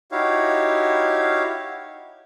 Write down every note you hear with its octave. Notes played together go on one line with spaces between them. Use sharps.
D#4 E4 F#4 G4 C#5 F5